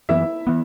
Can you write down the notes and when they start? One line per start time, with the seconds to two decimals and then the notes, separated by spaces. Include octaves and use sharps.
0.09 F#2 E3 B3 E4 E5
0.47 E3 B3